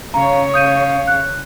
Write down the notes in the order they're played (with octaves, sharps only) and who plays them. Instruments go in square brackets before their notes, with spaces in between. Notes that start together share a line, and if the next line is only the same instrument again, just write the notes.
[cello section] C#3 C#5 [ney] F5 [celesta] A#5
[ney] F5 [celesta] D#6 G6 D#7
[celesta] F#6